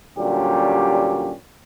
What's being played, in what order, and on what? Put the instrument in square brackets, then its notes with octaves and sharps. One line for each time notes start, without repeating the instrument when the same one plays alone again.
[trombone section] A#2 D3 F#3 G3 C#4 G4